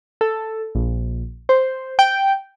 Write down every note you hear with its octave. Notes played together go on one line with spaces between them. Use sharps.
A4
A#1
C5
G5